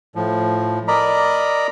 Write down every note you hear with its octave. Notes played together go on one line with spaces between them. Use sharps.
A2 F3
A#4 D5 D#5 A#5 B5